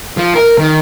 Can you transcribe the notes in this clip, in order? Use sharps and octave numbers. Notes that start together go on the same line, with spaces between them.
F3
A#4
D#3